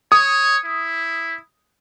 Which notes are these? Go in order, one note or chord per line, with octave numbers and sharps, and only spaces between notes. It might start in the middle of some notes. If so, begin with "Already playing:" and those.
C#5 D#6
E4